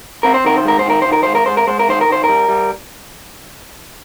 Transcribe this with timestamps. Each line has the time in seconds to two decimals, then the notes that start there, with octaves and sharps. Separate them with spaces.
0.23 C4 A#4
0.34 C5
0.45 D#3 A#4
0.58 C5
0.65 G#3 A#4
0.79 C5
0.86 D#3 A#4
1.02 D#3 C5
1.12 A#4
1.23 G#3 C5
1.35 A#4
1.46 G#3 C5
1.57 A#4
1.67 G#3 C5
1.79 A#4
1.88 D#3 C5
2.01 A#4
2.08 D#3 C5
2.24 G3 A#4
2.48 G3